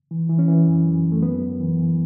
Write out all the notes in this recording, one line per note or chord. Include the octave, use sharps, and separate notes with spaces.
E3
E3
C#4
E3
F#2
F#2
F#2
A3
F#2 B3
F#2
E3
E3